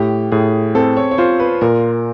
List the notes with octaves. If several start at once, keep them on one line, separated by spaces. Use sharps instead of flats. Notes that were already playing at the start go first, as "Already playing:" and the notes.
Already playing: A2 G4
A2 G#4
C4 A4
C#5
C#5
F4 C5
B4
A#2 A#4